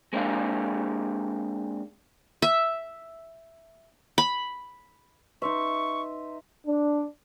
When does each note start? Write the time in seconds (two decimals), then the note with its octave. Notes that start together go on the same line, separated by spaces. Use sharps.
0.13 G#3 A#3 C4 D4 G#4 F5
2.42 E5
4.18 B5
5.42 D#4 B4 E5 C6 C#6
6.65 D4